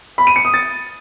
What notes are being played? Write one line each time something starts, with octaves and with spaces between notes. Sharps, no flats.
B5
D#7
C#7
D#6
A6